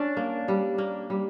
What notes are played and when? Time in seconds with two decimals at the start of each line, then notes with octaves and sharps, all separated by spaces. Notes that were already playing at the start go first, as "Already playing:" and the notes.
Already playing: C#4 D4
0.17 A#3
0.48 G3
0.78 A#3
1.10 G3